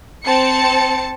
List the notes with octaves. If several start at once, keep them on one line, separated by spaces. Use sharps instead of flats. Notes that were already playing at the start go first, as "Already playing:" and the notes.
C4 A5 C#7